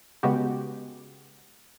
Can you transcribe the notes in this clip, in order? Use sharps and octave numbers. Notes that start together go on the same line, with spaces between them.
C#3 G#3 B3 F#4 G4